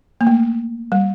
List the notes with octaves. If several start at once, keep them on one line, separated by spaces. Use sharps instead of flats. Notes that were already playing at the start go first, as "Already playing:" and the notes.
A#3
A3
G3